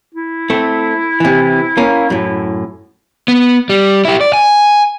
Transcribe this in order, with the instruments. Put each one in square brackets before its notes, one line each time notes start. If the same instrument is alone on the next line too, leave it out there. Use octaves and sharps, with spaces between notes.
[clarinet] E4
[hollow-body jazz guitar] A3 C4
C3 E3
A#3 C#4
F#2 A2
[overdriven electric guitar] B3
G3
E4 G4
D5
G#5